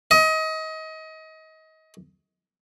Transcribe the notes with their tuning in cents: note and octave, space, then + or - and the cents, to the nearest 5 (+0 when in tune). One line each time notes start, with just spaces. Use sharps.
D#5 +30